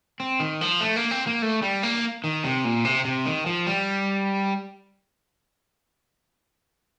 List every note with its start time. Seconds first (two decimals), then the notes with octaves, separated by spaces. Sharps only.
0.20 C4
0.40 D#3
0.61 F3
0.81 A3
0.96 A#3
1.11 C4
1.27 A#3
1.42 A3
1.62 G3
1.83 A#3
2.24 D#3
2.44 C3
2.64 A#2
2.85 C3
3.05 C3
3.26 D#3
3.46 F3
3.67 G3